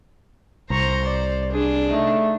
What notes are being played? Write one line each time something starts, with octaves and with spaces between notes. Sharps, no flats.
C2 C5 A#5 C#6
D5
D4 G#4
A3 D#4